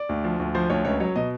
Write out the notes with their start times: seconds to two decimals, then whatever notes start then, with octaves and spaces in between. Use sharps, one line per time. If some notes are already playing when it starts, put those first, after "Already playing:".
Already playing: D5
0.09 D2
0.24 F3
0.39 D2
0.55 F3 C5
0.70 D2 C#5
0.85 C#2 C#5
1.00 F#3 C#5
1.16 B2 D#5